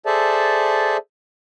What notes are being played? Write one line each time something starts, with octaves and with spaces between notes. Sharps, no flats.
G#4 A4 C5 D5 E5 A5